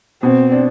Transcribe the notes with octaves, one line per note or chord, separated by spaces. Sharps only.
B2 C4
D4